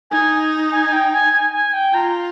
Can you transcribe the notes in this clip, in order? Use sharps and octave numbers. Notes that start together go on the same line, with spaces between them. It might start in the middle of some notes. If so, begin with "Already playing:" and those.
D#4 G#5
G#5
G#5
G5
G#5
G#5
G#5
G5
F4 A#5